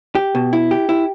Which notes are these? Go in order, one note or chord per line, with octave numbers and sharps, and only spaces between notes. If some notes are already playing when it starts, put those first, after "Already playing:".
G4
B2
E4
G4
E4